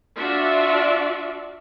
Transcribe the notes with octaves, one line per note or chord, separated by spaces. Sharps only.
D4 F4 F#4 D5 E5